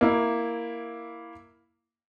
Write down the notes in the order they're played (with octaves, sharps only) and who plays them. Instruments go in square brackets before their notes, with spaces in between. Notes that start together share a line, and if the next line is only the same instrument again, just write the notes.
[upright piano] A#3 E4